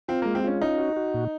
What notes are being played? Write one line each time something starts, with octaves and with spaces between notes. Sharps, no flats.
C4 F4
G#3 A#3
C4
C#4 F4
C#4 D#4
F#4
F#4
A#2